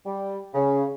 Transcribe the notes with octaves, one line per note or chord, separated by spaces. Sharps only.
G3
C#3